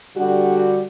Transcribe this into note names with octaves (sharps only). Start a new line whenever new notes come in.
D3 G3 F#4